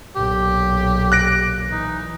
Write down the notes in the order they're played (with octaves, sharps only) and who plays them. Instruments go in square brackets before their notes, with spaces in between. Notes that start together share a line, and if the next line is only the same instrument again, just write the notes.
[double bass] B1 A#2 [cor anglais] G4
[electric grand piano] F#6 A#6 D7
[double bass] E3 [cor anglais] D#4